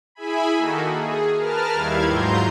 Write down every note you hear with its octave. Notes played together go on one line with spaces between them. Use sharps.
E4 G#4 E5 G#5 B5
D#3 A#3 D#4 F#4 A4
G#4
A#4 B4 A5 F6
D#2 D#3 G3 E4 F5 G#6
G#2 F#3 F4 A#5 C6 G6